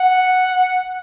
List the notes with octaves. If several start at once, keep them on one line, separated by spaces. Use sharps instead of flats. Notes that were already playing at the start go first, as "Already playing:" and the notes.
Already playing: F#5